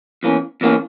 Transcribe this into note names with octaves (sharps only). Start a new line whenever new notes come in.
E2 E3 A#3 C#4
E2 E3 A#3 C#4